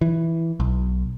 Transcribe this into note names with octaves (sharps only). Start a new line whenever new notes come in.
E3
B1